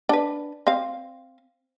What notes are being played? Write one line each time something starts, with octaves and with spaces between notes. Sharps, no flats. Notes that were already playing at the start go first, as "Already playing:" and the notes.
D4 B4
C4 F5